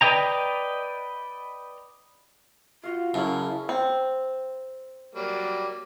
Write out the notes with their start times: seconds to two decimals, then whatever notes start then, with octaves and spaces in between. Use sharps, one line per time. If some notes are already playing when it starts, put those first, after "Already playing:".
0.01 B4 D5 D#5 G5 A#5
2.83 F4 F#4 F5
3.14 F#2 C#3 C#4 E4 A4
3.69 C4
5.15 F#3 G3 A#3